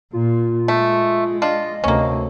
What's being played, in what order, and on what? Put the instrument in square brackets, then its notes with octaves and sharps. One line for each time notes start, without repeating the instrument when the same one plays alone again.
[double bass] A#2 [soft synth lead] F4
[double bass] G#3 [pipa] A3
[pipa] D4 F4 [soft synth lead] D#5
[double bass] D2 C3 [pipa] A#3 C#4